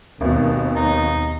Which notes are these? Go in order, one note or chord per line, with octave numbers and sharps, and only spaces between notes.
G#1 D#2 B2
D#4